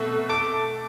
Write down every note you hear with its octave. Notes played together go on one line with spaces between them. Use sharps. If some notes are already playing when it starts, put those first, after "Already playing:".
Already playing: B2 A3 E6
A4 D6